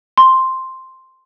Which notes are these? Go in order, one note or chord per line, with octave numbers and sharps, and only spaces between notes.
C6